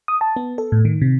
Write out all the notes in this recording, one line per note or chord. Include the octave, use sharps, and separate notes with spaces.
D#6
A5
B3
A4
A2
D#3
C3